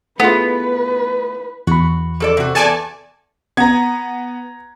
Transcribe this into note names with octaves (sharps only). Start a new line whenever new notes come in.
A3 B3 E4 F4 G#4 B4 F#5
E2 F#4 B5
F3 A4 D5
C3 F#4
E2 A4 D5 G#5 A5
B3 A#5 G#6